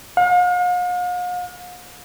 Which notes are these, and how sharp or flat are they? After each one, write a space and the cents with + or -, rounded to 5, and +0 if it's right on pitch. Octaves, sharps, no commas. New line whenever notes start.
F5 +45